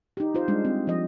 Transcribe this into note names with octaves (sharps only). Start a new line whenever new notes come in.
D#4 G4
F4 C5
G3 G#3 D4
C4
F3 D#5